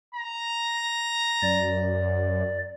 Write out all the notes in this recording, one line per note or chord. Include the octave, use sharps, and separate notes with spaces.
A#5
F#2 D5